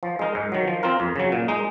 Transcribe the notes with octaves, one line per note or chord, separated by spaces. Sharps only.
F3
G#3 D#4 A#4
G#2
D#3 F#3
F3
C4 F4 A#4
F2
C#3 F#3
A#2
G#3 D#4